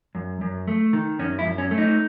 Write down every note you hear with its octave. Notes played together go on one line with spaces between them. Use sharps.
F#2
F#2
A3
D#3
F#2 C#4
E4
F#2
C#4
A3
D#4